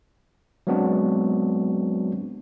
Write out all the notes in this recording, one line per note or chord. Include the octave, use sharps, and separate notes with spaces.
F#3 G#3 B3 C4 D4 F#4